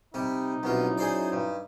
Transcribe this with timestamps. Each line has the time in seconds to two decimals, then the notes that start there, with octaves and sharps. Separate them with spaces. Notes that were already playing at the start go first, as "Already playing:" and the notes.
0.14 C3 G3 D#4
0.63 C2 B2 F#3 C#4 E4 F4
0.98 G#4 C5 D5
1.32 G2